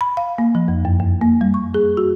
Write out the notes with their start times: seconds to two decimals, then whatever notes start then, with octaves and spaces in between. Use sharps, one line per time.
0.01 B5
0.17 F5
0.38 A#3
0.55 F3
0.68 F2
0.85 F#2
1.00 F#2
1.21 A#3
1.41 G3
1.54 C#6
1.74 G#4
1.97 F#4